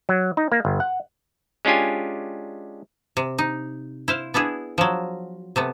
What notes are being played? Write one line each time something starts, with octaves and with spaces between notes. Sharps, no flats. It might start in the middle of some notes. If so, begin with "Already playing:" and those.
F#3
D#4
A#3
G1
F#5
G#3 C#4 D4 F4 G4 G#5
C3
D#4
E4 C5 F5
B3 D4 E4 G#4
F3 F#3
C3 A3 B3